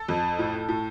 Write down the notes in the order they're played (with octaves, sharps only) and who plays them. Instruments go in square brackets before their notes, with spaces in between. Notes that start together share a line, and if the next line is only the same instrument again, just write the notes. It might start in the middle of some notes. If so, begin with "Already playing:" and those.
Already playing: [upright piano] A4
F2
A2
A2